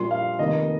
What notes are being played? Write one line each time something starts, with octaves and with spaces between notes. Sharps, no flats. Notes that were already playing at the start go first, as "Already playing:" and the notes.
Already playing: A#1 A#2 G3 C6
F5
F1 D#2 D#3 A#3 D#5